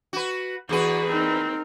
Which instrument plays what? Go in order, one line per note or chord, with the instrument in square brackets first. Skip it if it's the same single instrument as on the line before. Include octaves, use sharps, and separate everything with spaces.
[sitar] F#4 B4
[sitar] E2 E3 B4 [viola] F#4 G#4
[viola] C4 [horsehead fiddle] D#4 A#4